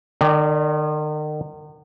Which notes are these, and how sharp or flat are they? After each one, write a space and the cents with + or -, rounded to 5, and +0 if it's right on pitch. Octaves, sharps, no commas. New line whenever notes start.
D#3 -40 D5 +0 G5 +0